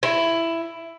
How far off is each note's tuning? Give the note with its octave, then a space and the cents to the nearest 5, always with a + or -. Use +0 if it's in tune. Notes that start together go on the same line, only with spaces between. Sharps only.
E4 +10